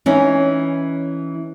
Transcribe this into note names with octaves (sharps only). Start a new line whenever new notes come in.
E3 C#4 D#4